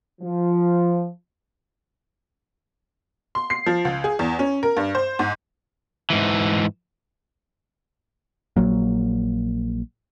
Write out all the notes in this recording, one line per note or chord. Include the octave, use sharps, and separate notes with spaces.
F3
C6
C7
F3
C#2
G#4
E2
C#4
A#4
G2
C5
G#2
G#2 E3
A#1 F#3 A#3